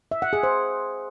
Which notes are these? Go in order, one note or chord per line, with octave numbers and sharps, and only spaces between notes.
E5
F#5
G#4
C5